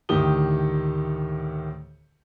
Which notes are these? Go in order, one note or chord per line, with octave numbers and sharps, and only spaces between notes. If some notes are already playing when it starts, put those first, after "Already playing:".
D2 A2 D#3 G4 D#6 G7